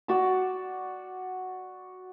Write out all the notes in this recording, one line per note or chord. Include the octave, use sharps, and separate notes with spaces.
F#4 D5 E6